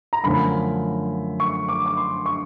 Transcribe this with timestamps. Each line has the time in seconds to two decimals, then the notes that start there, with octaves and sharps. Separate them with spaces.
0.13 A#5
0.24 F#2 D3 F3 A3 B5
1.40 C#6
1.68 D6
1.86 D6
1.97 C6
2.26 C#6